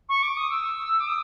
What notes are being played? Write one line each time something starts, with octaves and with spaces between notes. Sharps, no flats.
C#6
D6
D#6
E6
D6
D#6